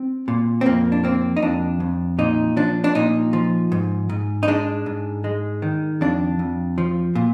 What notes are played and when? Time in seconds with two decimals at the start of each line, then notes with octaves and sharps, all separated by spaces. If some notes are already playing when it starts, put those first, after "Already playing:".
Already playing: C4
0.28 A#2
0.61 C4
0.66 F2 A#3
0.92 D4
1.04 A#3 C4
1.37 D#4
1.42 F2 D4
1.80 F2
2.19 A#2 D#4
2.57 F3 D4
2.84 D4
2.95 A#2 D#4
3.33 F3
3.72 G#2
4.09 G#2
4.43 D#4
4.48 G#3 D4
4.86 G#2
5.24 G#3
5.62 D#3
6.01 F2 D4
6.39 F2
6.78 F3
7.15 A#2